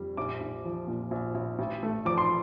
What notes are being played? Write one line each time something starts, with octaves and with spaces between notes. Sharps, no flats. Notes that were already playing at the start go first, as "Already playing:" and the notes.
Already playing: F2 G3
A#1 D6
A#1
F3
A#2
A#1
A#1
A1
A3
F3 D6
C6